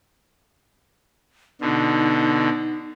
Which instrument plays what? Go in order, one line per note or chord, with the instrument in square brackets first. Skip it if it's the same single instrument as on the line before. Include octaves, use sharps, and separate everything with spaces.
[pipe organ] B2 D3 [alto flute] D#4